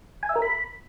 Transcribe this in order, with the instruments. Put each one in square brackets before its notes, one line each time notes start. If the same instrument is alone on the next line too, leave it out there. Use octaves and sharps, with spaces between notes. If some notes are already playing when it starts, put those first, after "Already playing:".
[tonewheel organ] G#5
E5
A#4
B5